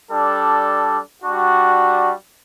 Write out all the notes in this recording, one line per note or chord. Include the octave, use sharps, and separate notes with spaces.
G3 D4 A4
G3 D4 F#4